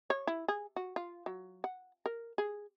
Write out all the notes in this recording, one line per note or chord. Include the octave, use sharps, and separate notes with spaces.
C#5
E4
G#4
F#4
F4
F#3
F#5
A#4
G#4